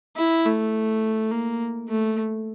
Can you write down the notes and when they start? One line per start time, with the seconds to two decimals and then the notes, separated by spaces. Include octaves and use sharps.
0.16 E4
0.45 A3
1.31 A#3
1.88 A3